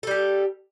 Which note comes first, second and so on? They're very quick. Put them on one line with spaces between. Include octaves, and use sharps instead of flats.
A4 G3 G4